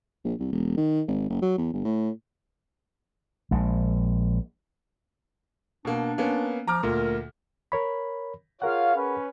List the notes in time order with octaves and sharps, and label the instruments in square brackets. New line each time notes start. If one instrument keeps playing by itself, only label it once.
[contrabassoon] A#1
C2
E1
D#3
G#1
F#1
F#3
E2
G1
A2
[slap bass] A#1 G#3
[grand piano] B2 A#3 [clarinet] D4
[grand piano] A#3 B3 C#4
[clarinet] F3 [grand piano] A#5 D6 F6
[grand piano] D2 A#2 [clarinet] A#4
[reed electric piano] A#4 C#5 B5
[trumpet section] F4 C#5 F5 [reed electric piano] G#4 A#4 F#5
[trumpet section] C#4 B4